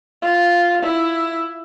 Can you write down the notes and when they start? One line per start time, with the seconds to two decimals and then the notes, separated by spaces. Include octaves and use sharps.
0.22 F4
0.82 E4